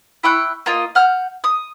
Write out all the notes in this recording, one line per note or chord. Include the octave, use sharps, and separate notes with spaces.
E4 G5 C#6 F#6
A#3 F4 D#5
F#5 F6 G6
D#6